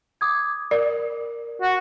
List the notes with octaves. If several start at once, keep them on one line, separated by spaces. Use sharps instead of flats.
D6 D#6 G#6
A#4 D5
F#4